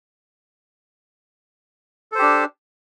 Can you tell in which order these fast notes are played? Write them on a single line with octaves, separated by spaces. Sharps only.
A4 C5 G4 D4